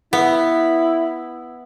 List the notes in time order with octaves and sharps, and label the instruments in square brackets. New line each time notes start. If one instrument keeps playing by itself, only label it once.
[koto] B3 [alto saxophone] E4